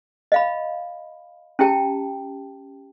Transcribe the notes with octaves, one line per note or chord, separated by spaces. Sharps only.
D#5 F5 B5
C#4 E4 G4 G5 A5